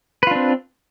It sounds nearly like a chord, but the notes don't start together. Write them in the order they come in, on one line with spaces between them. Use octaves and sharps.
B4 F4 D4 C4